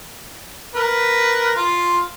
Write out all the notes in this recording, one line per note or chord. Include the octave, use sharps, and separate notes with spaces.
A#4 B4
F4